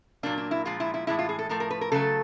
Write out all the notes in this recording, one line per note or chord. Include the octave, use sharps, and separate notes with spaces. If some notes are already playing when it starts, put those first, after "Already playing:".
A#2 F#3 A#3 D4
D4
E4
A#2 F3 G#3 F4
E4
E4
A2 E3 G#3 E4
F4
G#4
A4
A2 F3 A3 A#4
A#4
B4
A#4
C#3 F#3 A3 A4